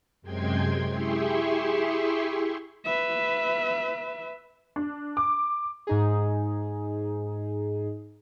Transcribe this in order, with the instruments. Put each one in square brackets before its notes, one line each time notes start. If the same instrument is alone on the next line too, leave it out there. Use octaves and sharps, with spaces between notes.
[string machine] F#2 C3 G#3 G5 C6 G#6
E4 G4 G#4 E5 C6 C#6
[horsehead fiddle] B4 E5
[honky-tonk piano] D4
D6
[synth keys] G#2 D#4 G#4